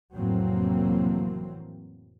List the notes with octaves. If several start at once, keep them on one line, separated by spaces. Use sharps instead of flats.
F1 A2 E3 F#3 A#3 C4